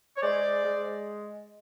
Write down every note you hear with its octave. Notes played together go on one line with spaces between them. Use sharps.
C#5
G#3 C5 D5
G#3